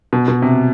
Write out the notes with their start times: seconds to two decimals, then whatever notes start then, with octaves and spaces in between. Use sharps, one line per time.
0.13 B2
0.28 B2
0.42 C3